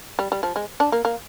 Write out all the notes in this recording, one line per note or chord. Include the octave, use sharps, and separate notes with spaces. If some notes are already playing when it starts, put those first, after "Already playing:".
G3
G3
F3
G#3
D4
A#3
A#3